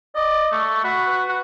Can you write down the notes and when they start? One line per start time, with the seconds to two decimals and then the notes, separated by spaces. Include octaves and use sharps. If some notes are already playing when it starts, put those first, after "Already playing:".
0.16 D5 D#5
0.52 A3 C#6
0.84 F#4 B5
1.07 B4
1.29 F#4